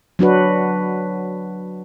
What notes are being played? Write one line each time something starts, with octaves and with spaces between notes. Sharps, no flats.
F#3 D4 F#4 B4